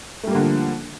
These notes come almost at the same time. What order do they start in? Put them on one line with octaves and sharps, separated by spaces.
A3 G3 A#3 D3 F3